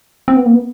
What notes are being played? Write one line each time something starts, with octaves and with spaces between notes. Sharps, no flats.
C4
B3
A#3
B3